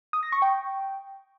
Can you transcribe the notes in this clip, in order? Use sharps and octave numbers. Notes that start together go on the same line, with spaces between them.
D#6
A#6
C#6
G5